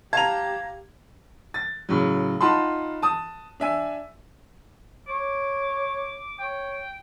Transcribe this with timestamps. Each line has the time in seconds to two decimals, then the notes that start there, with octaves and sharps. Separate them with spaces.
0.13 G4 F5 A5 A#5 G#6 F7
1.54 A6
1.89 A2 C#3 F#3
2.41 D#4 F4 F#5 A5 B5 C6
3.02 A5 D#6
3.60 D4 E5 G#5
5.08 C#5 D6
6.39 C#5 G5